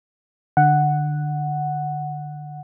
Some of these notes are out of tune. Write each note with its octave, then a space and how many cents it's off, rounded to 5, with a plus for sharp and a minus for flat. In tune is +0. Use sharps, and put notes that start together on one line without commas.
D3 +20 F#5 +0